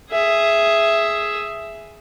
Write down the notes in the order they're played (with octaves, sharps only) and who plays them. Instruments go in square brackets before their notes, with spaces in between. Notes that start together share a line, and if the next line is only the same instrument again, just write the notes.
[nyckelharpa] G#4 E5